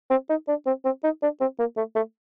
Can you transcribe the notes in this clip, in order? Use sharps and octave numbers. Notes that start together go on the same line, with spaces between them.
C4
D#4
D4
C4
C4
D#4
D4
C4
A#3
A3
A3